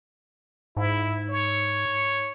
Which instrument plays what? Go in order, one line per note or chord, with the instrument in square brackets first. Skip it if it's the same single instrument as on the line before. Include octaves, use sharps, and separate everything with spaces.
[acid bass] G#2 [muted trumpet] E4
[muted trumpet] C#5